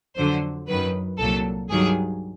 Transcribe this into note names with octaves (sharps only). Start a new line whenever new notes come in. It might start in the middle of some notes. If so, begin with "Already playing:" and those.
F2 D3 F#3 C5
F#2 D#3 F#3 B4
C2 A#2 F#3 A4
G2 D#3 F#3 G#4